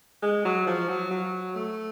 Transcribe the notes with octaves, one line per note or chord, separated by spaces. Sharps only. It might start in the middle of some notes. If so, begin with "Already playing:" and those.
G#3
F#3
F3
F#3
F#3
A3